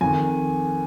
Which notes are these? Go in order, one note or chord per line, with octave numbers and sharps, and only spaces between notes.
F2 D#3 G#5